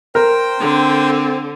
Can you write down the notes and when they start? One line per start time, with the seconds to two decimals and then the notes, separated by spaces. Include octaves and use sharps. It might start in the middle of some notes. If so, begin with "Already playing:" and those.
0.15 A#4 C5 G5
0.60 D3 C4